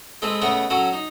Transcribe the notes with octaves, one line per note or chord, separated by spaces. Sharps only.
G#3 C4 A4 B4
C#3 A3 B3 D#5 C#6
F#3 C#4 F#4 A4
D#4